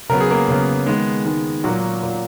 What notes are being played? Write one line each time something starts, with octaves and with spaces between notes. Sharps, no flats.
C#3 F#3 B3 A#4
G#4
A#3 A#4
C#3 F#3 B3
D#3 G#3 B3 G#4
D#3 G#3 B3
A#2 F#3 A#3 F#4
A#2 A#3